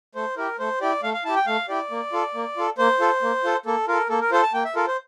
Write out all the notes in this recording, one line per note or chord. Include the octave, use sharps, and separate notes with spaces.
A3 C5
E4 G4 A#4
A3 C5
E4 G4 D5
A3 F5
F5
E4 G4 A5
G5
A3 F5
E4 G4 D5
A#3
F4 A4
A#3
F4 A4
A#3 C5
F4 A4
A#3
F4 A4
A#3 A4
F4 A4 A#4
A#3 A4
A#4
F4 A4 C5
A5
A#3 G5
E5
F4 A4 A#4
C5